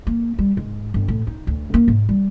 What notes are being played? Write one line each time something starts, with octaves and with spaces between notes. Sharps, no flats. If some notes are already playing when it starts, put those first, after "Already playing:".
A#3
G3
G#2
G1
A2
D#4
D2
A#3
G#2
G3